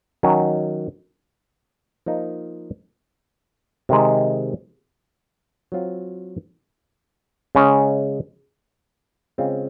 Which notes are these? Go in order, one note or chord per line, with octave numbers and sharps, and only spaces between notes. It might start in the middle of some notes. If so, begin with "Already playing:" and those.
D#3 F#3 C#4
F3 A#3 D#4 A#4
C3 D#3 G#3
F#3 C4 F4
C#3 G#3 C#4
C#3 G#3 C4 F4